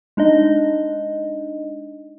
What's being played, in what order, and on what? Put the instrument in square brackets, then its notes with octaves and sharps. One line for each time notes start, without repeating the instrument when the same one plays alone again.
[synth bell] G#3 D4 D#4 D#5